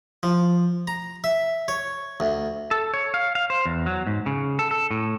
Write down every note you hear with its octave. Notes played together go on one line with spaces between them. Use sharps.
F3
A#5
E5
C#5
D2
A4
C#5
F5
F5
C5
E2
F#3
G#2
C#3
A4
A4
A2